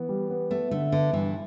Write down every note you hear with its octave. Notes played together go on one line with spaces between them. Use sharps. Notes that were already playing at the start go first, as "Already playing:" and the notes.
Already playing: E3 B3
G3
B3
A3 B3
D3 A3
D3 B3
G2 E3